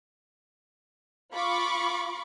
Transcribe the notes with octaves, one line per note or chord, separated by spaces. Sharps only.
F4 B5 C#6 D6